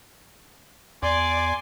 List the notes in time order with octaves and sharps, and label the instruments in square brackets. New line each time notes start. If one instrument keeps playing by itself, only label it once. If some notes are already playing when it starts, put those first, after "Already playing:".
[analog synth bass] E2 [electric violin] D5 [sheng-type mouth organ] G#5 C6 D6